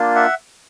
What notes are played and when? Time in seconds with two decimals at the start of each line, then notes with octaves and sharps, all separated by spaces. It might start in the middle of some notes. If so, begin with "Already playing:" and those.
Already playing: A#3 D4 F4
0.15 E5 F#5